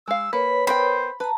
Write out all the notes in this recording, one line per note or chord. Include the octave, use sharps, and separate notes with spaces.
G#3 F5 E6
A#3 B4 C#5 B5
B3 A#4 C5 G5 B5
B4 A5 A#5